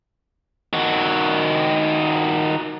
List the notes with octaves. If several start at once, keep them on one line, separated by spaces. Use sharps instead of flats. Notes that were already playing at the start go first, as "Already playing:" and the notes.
D#3 F#4